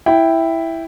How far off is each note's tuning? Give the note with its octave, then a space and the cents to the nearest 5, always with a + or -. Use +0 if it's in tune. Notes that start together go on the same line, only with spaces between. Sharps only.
E4 +0 G5 +0